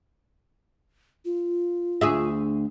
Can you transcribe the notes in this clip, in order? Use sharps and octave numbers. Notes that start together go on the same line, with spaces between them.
F4
D2 G#4 E5